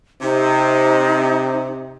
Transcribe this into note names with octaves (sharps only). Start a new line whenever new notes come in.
C3 D#4